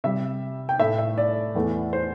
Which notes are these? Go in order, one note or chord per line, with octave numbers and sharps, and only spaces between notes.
C3 G3 E5
G5
A2 A3 E5
E5
D5
E2 E3 A3
C5